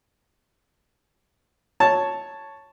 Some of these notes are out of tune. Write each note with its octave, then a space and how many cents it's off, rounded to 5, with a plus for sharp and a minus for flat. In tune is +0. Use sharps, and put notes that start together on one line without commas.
C#5 +0 A5 +0